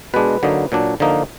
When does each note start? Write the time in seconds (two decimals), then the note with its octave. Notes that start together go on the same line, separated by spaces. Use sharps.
0.14 B2 G#3 D4 B4
0.43 D3 F#3 A#3 D#4
0.72 A#2 F#3 D4
1.00 D3 F3 A#3 D#4